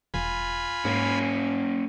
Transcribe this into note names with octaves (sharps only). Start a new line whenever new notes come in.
E1 F4 G#5 B5
G#2 A#3 C#4